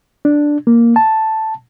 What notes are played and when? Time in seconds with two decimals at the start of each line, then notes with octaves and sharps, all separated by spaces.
0.25 D4
0.67 A#3
0.96 A5